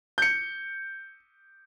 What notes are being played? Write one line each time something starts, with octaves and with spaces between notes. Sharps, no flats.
G6 C#7